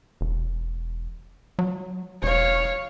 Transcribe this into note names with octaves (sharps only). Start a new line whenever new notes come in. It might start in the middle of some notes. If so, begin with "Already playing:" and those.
E1
F#3
E1 C#5 F5